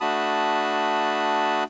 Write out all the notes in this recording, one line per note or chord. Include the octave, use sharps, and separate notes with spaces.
A3 D4 F#4 A5 B5 D#6